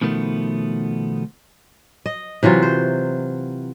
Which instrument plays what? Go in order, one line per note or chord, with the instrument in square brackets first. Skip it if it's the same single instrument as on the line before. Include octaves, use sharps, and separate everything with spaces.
[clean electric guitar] B2 D#3 F3 A3 B3
[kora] D#5
C3 E3 F#3 F4
C5